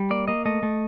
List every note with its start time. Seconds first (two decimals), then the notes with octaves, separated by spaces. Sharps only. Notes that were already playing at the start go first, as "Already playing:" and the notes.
Already playing: G3
0.10 A#3 D5
0.28 A#3 D#5
0.45 A3 D#5
0.63 A3